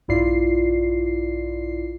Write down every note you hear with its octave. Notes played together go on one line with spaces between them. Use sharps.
A#1 G2 E4 F4 D5 C7